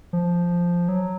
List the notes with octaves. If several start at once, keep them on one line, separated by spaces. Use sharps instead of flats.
F3
F#3